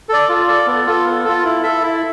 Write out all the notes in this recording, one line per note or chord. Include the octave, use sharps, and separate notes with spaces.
A4 D5
F4
A4 D5
B3
F4 A4
B3
F4 A4
E4
A4 E5
E4